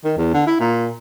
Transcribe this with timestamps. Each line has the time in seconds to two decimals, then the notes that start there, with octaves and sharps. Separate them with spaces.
0.05 D#3
0.18 E2
0.34 D3
0.47 E4
0.60 A#2